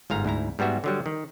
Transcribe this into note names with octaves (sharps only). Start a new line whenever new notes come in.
G1 G#2 F5 A#5
D2 G#2 E4 A#5
G#2 G3 B3 F#4 E5
D3 F#3 G3
D#3